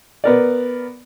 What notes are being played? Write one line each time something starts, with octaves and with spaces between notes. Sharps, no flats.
B3 A#4 D5